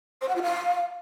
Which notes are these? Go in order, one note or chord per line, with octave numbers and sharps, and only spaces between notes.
C5
F#5
F4
F5